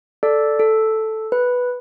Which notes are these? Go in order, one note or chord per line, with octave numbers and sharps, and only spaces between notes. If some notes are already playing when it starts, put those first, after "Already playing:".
A4 D5
A4
B4